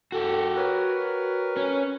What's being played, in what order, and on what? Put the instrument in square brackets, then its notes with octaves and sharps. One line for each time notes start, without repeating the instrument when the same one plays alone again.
[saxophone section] F#2 A4 [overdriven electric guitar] F#4 G4
[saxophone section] A#4 B4 C#5
[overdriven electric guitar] C#4